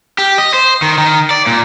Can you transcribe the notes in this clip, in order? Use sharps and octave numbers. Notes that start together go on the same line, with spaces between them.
G4
D#5
C5
D#3
D#3
D5
A#2